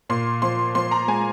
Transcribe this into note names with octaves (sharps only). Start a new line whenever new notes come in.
A#2 C6
F3 C6
F3 C6
A#5
G#3 G#5